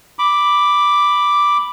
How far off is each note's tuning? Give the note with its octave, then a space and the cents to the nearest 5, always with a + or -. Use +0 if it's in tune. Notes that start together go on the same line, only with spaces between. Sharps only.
B5 +0 D6 +0